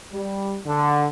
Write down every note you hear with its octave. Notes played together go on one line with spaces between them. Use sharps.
G3
D3